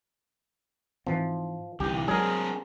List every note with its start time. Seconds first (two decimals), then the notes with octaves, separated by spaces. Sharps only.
1.07 G#2 E3 F3 C4
1.80 C2 D3 E3 G4
2.08 F#3 G#3 C4 D4 G#4 A#4